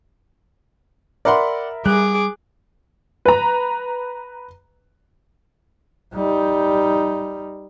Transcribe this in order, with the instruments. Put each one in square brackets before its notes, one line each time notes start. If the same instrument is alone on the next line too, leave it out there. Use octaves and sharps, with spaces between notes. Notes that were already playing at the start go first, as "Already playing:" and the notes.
[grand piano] A#4 E5 B5 [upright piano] D5 F#5 C6
[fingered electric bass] G3 [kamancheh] G#4 D6 [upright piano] F#6
[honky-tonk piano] B4 A#5
[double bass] G3 D#4